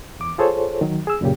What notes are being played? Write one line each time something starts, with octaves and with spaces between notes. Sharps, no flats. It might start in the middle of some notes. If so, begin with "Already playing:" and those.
E2 D6
F4 G#4 A4 C5 C#5
D#3 F#3
G#4 E6
F#2 A#2 C#3 G4